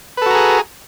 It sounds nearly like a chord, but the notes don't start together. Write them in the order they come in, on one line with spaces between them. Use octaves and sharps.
B4 A4 F#4 A#5 G#4